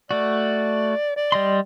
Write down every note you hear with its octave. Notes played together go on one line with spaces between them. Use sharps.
A3 F#4 D5
D5
G3 D#5 C6